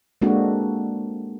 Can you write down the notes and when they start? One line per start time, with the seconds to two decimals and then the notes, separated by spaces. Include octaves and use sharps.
0.22 G#3 A#3 C4 D4 F#4 A4